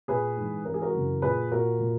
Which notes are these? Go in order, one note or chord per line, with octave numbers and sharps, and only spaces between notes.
A#2 G#4 B4
G#2 E3
G#2 E3 A#4
G#4
F#4 A#4
F#2 C#3 E3
A#2 G#4 B4
A#2 F#4 A#4
A#2